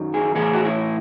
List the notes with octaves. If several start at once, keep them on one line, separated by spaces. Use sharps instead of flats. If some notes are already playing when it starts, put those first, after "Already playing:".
Already playing: F#2 D#3 F#3
G#4
A2 E3 G#4
F#4
E4